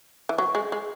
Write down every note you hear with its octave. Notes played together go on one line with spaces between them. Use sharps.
E3
F#3 C#6
G#3
G#3